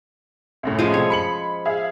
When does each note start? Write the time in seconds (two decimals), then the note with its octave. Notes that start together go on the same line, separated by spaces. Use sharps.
0.63 C2 F#2 A2
0.79 F3 G#3 C#4
0.94 C3 G3 A3 C#5
1.10 B5 C#7 F#7
1.65 G#4 E5 F5